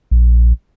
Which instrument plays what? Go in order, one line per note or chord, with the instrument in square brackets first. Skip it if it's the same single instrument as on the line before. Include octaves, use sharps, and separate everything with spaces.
[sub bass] A#1